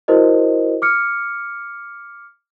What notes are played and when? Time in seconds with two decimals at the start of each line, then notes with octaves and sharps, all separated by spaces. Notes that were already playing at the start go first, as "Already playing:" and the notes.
0.08 E4 F#4 A#4 C5 D#5
0.82 D6 F6 C#7